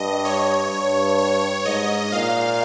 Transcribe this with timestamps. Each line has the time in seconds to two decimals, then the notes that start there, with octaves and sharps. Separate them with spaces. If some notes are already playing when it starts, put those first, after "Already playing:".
Already playing: G2 D#5
0.25 C#5
0.71 G2
1.18 C#5
1.65 G#2 D#5
2.12 A#2 F5